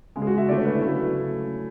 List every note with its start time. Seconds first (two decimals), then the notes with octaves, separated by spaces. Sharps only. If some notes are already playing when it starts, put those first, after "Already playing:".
0.16 C#3 G#3
0.22 G#4
0.27 F#4
0.38 E5
0.48 D3 A3 D5
0.57 C#5
0.65 B4
0.73 E4
0.82 C#3 F#3 A3